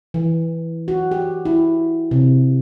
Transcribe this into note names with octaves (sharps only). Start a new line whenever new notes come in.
E3
F#4
G4
E4
C3